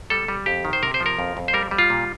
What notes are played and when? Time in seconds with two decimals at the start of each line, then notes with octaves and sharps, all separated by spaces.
0.10 G3 A4
0.28 G3
0.46 F2 G4
0.65 D#3
0.73 C5
0.83 C3 A#4
0.94 C5
1.00 F3
1.06 A#4
1.19 F2
1.37 F2
1.48 C5
1.53 G3 A#4
1.71 G3
1.78 F4
1.90 A#2